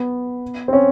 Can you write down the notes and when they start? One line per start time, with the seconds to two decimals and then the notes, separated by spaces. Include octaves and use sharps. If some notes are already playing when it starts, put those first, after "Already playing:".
Already playing: B3
0.68 C4
0.73 C#4